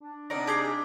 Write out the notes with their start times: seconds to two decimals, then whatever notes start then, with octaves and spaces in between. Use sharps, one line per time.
0.01 D4
0.30 C3 D#4 A#4 D5 F#5
0.47 G4 G#4 A5 D6 C7